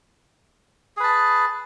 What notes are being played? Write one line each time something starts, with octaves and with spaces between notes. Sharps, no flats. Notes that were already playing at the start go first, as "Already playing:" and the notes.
G#4 B4 A5